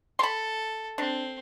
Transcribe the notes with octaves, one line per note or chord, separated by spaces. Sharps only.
A4 B5 C6
C4 D4